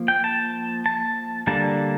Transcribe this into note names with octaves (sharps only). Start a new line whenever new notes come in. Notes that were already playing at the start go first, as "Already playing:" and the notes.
Already playing: F3 A#3
G5
A5
A5
D3 G3 A#3 D4 A5